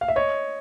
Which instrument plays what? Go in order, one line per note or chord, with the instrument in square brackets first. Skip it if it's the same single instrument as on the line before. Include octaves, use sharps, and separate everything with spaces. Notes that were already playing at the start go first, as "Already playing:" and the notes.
[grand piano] F5
E5
C#5 D#5